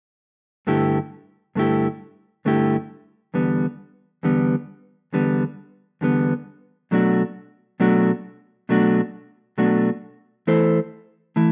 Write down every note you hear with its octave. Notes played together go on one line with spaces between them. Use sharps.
G2 D3 A3 E4 G4
G2 D3 A3 E4 G4
G2 D3 A3 E4 G4
E2 D3 G3 B3
E2 D3 G3 B3
E2 D3 G3 B3
E2 D3 G3 B3
B2 F#3 A3 D4 F#4
B2 F#3 A3 D4 F#4
B2 F#3 A3 D4 F#4
B2 F#3 A3 D4 F#4
E3 A3 E4 A4 C5
E3 A3 E4